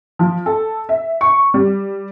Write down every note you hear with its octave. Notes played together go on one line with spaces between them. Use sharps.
F3
A4
E5
C#6
G3